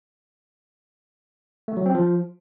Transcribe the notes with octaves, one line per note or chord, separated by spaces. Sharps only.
A3
F#3
C4
F3